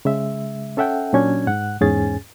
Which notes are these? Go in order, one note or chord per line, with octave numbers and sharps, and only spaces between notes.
C#3 G#3 E5
C#4 A4 E5 F#5 G5
A#2 F#3 C#4 D4 G#6
G#2 F#5 F#6
E2 G#2 C#4 G#4 G#5 A6